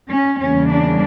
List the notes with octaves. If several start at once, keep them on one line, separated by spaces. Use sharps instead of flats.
C#4
E2 C#3 G3 A#3 C#4
D4